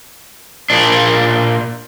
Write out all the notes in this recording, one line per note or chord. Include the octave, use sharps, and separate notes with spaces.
A#2 D4